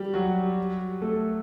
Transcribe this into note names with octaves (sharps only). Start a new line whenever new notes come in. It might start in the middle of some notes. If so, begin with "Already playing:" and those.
Already playing: G3 G4
F#3 F#4
A3 A4